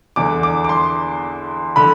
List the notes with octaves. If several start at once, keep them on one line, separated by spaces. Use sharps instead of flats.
E2 D3 D6
D6
D6
C6
D3 B5